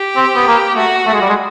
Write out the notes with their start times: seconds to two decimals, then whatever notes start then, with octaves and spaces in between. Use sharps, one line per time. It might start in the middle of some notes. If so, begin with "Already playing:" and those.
Already playing: G4
0.16 C4
0.36 B3
0.47 A#3
0.76 A3 F#4
1.07 A3
1.14 G#3
1.21 G3
1.29 G#3